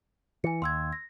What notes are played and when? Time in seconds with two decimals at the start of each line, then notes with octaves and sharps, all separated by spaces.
0.44 E3 G#5 C#7
0.62 D#2 C6 E6 G#6
0.93 A#6